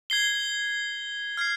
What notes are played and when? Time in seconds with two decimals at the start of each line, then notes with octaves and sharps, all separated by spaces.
0.10 G#6 C7 G7
1.37 F6 G#6 C7